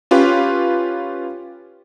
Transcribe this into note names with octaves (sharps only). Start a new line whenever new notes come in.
C#4 F4 G4 B4